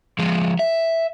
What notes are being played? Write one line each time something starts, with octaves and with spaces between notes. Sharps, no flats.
F3 G#3
E5